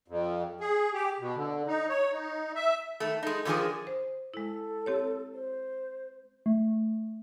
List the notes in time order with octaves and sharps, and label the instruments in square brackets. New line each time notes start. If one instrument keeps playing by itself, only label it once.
[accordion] F2
G#4
G4
B2
D3
D#4
C#5
D#4
E5
[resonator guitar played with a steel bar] D#3 A3
G#3 D#4
D3 D#3 F3 C#4 G#4 A#4
[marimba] C5
[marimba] G#3 E4 [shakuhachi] A4
[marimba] C4 G4 C#5
[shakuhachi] C5
[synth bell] A3